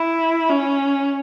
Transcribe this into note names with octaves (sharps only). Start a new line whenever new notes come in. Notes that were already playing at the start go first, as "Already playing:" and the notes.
Already playing: E4
C#4